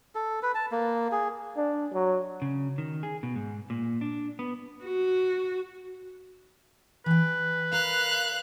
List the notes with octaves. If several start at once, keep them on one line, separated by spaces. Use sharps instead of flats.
A4
B4
A5
A#3
G#4
D4
F#3
C#3
D#3
G#4
B2
G#2
A#2
D4
B3
F#4
E3 B4 G5
A#4 F5 F#6